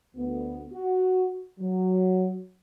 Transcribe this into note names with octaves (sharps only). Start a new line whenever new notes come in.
D2 B3
F#4
F#3